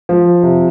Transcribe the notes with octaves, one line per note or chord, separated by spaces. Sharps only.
F3
C3